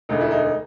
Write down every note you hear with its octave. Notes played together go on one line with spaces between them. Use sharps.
E1 D2 D3 D#4
E4
D#4